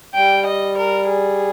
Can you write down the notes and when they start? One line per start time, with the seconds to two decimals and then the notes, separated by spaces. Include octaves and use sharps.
0.14 G3 G5
0.45 D#5
0.77 A#4
1.09 G#4